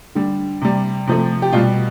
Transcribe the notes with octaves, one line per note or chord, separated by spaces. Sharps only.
D3 G3
C3 G3
C3 F3 A3
G4
B2 G3 F4